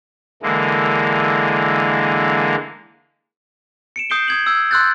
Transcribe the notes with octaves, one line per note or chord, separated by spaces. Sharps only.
D3 E3 G#3 A#3
C#7 D7 E7
D#6 G6 C7 D7 G7
D#6 G#6 F#7
E6 G#6
C6 E6 F#6 G6 A6